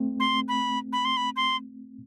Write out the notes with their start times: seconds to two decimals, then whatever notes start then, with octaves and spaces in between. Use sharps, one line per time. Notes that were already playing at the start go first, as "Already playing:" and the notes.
Already playing: A3 C4
0.20 C6
0.48 B5
0.93 B5
1.05 C6
1.17 B5
1.36 C6